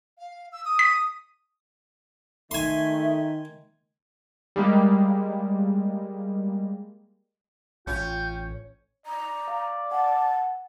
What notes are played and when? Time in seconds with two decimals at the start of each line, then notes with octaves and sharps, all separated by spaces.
0.18 F5
0.52 E6
0.65 D#6
0.79 B6
2.51 D#3 A3 E5 G#5 C6
4.56 G3 G#3 A#3
7.87 A1 C#4 F4 G5
9.06 D5 A#5
9.48 F5
9.91 F#5 A5